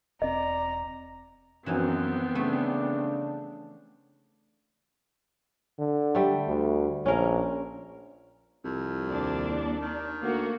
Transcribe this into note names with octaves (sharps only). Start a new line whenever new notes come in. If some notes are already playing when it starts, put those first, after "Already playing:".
E1 C4 D5 D#5 A#5
F#2 E3 F3 B3 C4 D#4
C#3 A3 D4
D3
G3 A3
D2
A#1 C#4 A#4
C2 F2
D#2 D4
D#3
D2 A#3 F#4